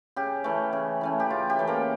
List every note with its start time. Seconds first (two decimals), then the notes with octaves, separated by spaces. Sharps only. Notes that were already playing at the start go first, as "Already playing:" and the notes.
0.16 C#3 G4
0.44 E3 A3 C#4
0.73 C#3
1.01 E3 A3 C#4
1.20 G4
1.30 C#3 F4
1.50 G4
1.59 E3 A3 C#4
1.67 A#3 A#4